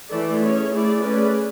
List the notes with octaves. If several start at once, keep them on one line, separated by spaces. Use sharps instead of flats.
E3 A3 E4 A4 D5
C#4 G#4 C#5
A3 E4 G#4 D5
A3 C#4 G#4 B4 D5